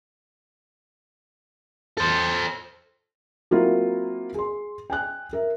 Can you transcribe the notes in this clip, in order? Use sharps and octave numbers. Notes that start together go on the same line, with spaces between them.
A4 C5
F#3 A#3 C4 E4 F4
G#4 C6
G5 G#5 F#6
A#4 E5